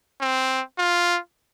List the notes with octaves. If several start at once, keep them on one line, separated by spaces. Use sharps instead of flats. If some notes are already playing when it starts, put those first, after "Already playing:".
C4
F4